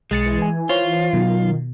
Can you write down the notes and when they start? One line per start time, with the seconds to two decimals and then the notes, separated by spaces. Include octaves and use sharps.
0.11 B1 G#3 A6 C#7
0.25 E3
0.42 G#5
0.69 F4 C5 C#5
1.13 B2 D#3 F#3